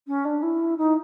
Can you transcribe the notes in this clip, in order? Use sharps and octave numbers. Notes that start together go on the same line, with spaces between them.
C#4
D4
E4
D#4